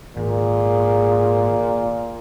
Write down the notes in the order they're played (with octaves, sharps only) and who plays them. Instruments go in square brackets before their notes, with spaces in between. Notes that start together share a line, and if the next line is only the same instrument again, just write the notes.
[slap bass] G#1 [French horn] A#2 [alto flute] G#4